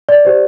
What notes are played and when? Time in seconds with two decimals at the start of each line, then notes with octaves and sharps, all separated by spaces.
0.09 D5
0.25 G4 C5